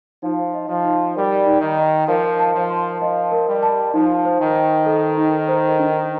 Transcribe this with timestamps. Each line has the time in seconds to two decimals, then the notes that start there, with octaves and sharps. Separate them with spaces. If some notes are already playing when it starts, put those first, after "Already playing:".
0.23 F3 D#4
0.54 D#5
0.68 F3
0.84 D#4
1.15 G3 A#4
1.46 D#4
1.61 D#3
1.77 D#5
2.08 F3 A#4
2.39 A5
2.54 F3
2.70 C6
3.01 F3 D#5
3.32 A#4
3.48 G3
3.63 A5
3.94 F3 D#4
4.25 C5
4.40 D#3
4.56 G5
4.86 A4
5.18 D#4
5.48 C5
5.79 D4